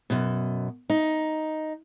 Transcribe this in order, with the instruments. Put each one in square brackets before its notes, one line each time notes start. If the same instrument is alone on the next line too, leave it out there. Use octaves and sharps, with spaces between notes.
[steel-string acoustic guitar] F#2 B2
D#4